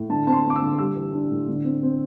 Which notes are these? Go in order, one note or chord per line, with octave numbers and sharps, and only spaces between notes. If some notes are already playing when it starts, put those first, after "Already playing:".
Already playing: A2
D3 A5
C4 A5
C6
C4
D6
E6
D3
G3 E6
E3
D4
A2
D3
C4
C4